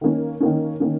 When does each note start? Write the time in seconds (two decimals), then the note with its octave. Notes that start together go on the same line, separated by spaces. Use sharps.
0.01 D#3 A#3 C#4
0.40 D#3 A#3 C#4
0.80 D#3 A#3 C#4